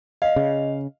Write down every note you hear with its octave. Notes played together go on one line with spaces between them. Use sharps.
D#5 F5
C#3